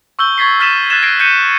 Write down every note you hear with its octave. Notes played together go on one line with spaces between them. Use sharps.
C#6 E6 G6 G7
C#6 G#6 A6 B6 C7
E6 F6 A6 B6 D#7 E7
F6 F#6 G#6 A6 B6 E7
F#6 G#6 A#6 C7 D7 D#7
F#6 G6 A#6 C#7 D#7